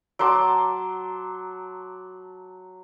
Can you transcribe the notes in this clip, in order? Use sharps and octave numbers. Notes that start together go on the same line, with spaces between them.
F#3 A5 C6 D6